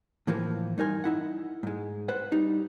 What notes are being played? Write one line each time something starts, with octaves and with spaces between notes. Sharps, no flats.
A2 E3 F3 A#3
G2 D#4 A#4 G#5 C6
D#4 E4 F#5
G#2 G#3
B4 C5 F#5
G3 D#4